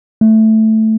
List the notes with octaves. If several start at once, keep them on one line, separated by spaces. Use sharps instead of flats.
A3